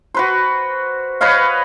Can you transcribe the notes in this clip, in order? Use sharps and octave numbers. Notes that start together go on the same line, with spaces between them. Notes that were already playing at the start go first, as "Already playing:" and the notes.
F#4 B4 C5
B4 C#5 D#5 F5